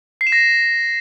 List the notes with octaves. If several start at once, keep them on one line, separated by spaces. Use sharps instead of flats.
C7
E7
A#6